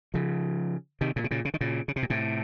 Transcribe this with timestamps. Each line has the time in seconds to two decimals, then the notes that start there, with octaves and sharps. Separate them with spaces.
0.14 C#3 F3
1.01 C3 D#3
1.16 A#2 C#3
1.24 C3
1.31 A#2 C#3
1.45 C#3
1.54 D#3
1.61 A#2 C#3
1.88 C#3
1.96 C3
2.03 A#2
2.10 A2 C3